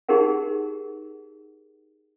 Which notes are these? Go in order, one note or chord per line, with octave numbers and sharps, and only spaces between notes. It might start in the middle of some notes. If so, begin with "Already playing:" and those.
D#4 G4 G#4 A#4 F#5